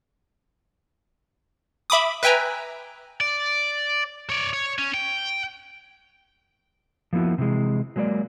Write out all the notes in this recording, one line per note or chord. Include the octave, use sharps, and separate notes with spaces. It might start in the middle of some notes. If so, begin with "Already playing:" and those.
E5 B5 D6 D#6
B4 E5 G5 G#5 A#5
D5
C#5 D5
C#5
C#4
G5
F3 A#3 B3 E4 F#4
C3 E3 G#3
F#3 G#3 A#3 B4 D5